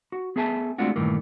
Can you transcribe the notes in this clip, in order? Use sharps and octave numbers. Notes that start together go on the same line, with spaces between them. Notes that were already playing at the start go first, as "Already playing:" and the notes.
F#4
B3 G#4 A4 E5 G#5 A5
G#3 A3 C4 D4 F4 F#4
G2 A#2 D#3 E3 A3 A#3